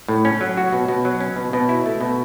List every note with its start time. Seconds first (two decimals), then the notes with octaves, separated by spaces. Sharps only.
0.08 A2
0.25 C#4
0.41 F#3
0.57 F#4
0.73 B2
0.88 B2
1.05 F#3
1.20 C#4
1.36 B2
1.53 B2
1.69 E4
1.86 A3
2.01 B2